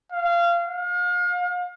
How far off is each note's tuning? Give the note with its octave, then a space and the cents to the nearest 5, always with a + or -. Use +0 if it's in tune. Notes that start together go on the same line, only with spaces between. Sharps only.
F5 -20
F5 +35